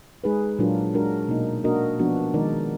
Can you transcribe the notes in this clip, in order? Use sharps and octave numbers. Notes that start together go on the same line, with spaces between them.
G#3 D#4 G#4 B4
A#2 F#3 D4 F4 A#4
G#3 D4 F#4 A#4
B2 A#3 D#4
A#3 D4 F#4 A#4 D#5
F3 B3 D4 F#4
D#3 G#3 D#4 A#4 D5